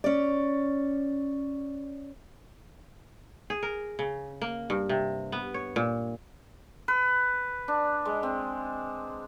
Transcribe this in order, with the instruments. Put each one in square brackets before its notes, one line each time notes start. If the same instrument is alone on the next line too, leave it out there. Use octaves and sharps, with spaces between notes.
[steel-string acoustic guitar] C#4 D5
[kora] G#4
A#4
C#3
A#3
G2
C3
B3
C#5
A#2
[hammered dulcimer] B4
D4
G#3
C4